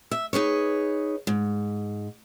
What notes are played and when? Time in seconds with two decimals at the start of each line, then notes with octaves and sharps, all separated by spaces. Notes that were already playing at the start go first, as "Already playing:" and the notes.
0.11 E5
0.33 D#4 G#4 B4 C#5
1.27 G#2